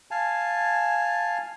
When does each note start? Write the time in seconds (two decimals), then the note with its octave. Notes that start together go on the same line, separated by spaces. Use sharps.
0.11 F5 G#5 A5